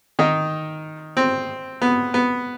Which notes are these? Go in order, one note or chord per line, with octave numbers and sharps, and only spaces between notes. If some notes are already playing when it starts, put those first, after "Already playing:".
D#3 D#4
C4
B3
B3